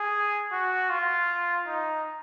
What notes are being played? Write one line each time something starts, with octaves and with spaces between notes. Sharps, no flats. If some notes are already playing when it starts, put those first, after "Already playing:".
Already playing: G#4
F#4
F4
D#4